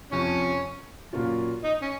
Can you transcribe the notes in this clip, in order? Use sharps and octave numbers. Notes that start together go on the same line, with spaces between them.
F2 C3 F3 C#4
A#2 F#3 A#3 C#4 F4
D#4
C#4